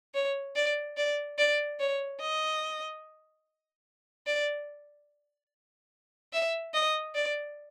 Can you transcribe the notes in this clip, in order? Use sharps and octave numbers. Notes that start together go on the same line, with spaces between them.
C#5
D5
D5
D5
C#5
D#5
D5
E5
D#5
D5